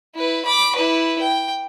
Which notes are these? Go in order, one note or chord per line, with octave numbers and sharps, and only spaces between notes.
E4 B4
B5 D6
E4 B4
G5